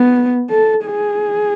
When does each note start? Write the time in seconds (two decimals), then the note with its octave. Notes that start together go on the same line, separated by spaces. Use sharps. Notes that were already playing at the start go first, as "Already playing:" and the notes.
Already playing: B3
0.50 A4
0.85 G#4